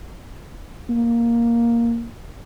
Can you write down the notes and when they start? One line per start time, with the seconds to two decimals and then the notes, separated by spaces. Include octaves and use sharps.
0.89 A#3